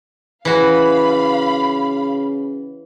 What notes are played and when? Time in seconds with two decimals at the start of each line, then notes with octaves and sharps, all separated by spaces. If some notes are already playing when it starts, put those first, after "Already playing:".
0.45 C#3 E3 F#4 F5 B5